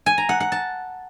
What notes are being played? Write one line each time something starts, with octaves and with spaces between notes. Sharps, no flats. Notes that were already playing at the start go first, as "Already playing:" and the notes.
G#5
A#5
F#5
F#5
A5